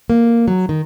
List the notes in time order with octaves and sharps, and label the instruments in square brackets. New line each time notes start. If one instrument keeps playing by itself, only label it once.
[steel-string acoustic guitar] A#3
F#3
D#3